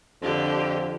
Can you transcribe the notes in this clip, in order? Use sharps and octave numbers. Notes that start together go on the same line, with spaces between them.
F2 D3 G4